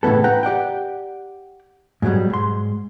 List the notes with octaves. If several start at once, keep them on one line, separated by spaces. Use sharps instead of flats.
A2 C#3 E3 B3 A4
B4 F#5 G5 A#5
G4 D5 F#5 G5
G#2 B2 E3 F#3 G3
G#2 C6